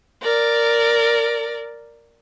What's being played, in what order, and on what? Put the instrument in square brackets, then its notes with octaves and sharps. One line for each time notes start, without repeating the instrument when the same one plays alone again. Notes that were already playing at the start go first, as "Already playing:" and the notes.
[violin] A#4 D5